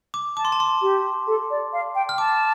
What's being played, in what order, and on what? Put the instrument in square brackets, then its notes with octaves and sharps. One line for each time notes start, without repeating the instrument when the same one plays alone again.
[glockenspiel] D6
[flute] A5 [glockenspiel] D6
[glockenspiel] C6
A5
C6
[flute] G4
A4
D5
F5
G5
[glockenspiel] F6
[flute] A5 [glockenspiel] D6